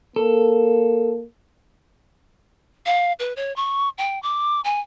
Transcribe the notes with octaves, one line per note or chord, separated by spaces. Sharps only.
A#3 A4
F5
B4
C#5
C#6
G5
D6
G#5